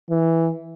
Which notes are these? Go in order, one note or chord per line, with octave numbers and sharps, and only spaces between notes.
E3